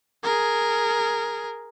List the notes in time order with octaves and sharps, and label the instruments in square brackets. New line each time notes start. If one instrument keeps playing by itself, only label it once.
[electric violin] G#4 A#4